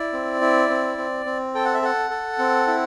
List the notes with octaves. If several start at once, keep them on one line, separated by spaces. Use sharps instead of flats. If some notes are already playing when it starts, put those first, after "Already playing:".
Already playing: E4 D5
C4
E4
C4
C4
C4
A4 G5
F#5
E5
A4 F#5
A4
C4
E4